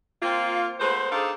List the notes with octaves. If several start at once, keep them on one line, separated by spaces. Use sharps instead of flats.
A#3 C4 F4
G#3 A3 B3 B4 C5
D4 D#4 G#4 A4 C5 F5